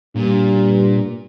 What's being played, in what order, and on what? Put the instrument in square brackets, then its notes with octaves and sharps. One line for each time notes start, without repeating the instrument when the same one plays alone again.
[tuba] G2 [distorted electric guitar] A#2